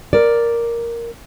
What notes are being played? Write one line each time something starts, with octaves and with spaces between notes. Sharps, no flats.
A#4 D5